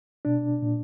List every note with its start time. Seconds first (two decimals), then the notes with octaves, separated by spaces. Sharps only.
0.25 B2 D4
0.62 A#2